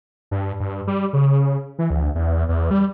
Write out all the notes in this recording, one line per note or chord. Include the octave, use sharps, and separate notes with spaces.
G2
G2
G3
C#3
E3
D2
E2
E2
E2
G3